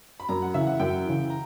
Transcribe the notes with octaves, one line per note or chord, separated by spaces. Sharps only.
B5
F#2 A#5
F#5
C#3 E3 E5
F#5
F#2 G5
C#3 E3
A#5